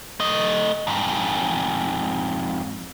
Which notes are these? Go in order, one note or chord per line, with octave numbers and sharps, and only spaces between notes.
A3 D#5
F2 G#2